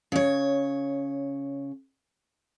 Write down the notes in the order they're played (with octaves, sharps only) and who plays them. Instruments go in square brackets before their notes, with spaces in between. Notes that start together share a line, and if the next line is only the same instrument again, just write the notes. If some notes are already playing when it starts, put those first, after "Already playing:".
[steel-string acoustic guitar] C#3 C#5